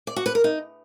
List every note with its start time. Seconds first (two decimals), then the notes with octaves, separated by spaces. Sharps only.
0.07 D5
0.16 F#4
0.26 B4
0.35 A#4
0.44 D#4